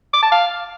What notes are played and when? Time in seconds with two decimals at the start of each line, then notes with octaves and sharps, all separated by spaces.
0.14 D6
0.23 A5
0.32 F5